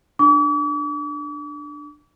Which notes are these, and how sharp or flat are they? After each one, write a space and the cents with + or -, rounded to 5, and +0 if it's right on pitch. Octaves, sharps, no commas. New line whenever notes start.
D4 +15 D6 -45